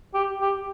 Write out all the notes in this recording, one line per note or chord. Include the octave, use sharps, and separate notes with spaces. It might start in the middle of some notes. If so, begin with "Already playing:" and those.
G4
G4